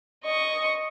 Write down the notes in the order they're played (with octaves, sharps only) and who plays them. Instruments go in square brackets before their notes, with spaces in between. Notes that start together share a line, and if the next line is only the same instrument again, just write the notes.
[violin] D#5 C#6